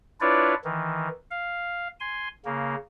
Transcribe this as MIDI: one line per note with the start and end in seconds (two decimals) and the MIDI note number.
0.21 0.54 62
0.21 0.54 64
0.21 0.54 65
0.21 0.54 71
0.21 0.54 73
0.21 0.54 74
0.64 1.09 51
0.64 1.09 52
1.31 1.88 77
2.00 2.28 80
2.00 2.28 84
2.45 2.75 49
2.45 2.75 58